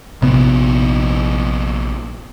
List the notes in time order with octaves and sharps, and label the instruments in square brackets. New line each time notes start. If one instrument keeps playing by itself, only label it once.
[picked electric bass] A#1 C3 B3